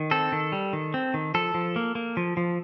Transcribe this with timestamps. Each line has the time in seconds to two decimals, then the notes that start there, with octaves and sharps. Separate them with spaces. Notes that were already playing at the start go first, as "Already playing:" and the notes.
Already playing: D#3
0.11 C4 A4
0.32 D#3
0.52 G3
0.73 D#3
0.94 C4
1.14 D#3
1.34 F3 A4
1.54 F3
1.76 A#3
1.95 A#3
2.17 F3
2.37 F3